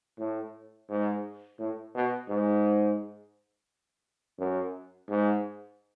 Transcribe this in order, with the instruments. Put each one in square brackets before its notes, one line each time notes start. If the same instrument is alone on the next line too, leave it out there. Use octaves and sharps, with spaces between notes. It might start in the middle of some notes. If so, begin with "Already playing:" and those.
[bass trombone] A2
G#2
A2
B2
G#2
F#2
G#2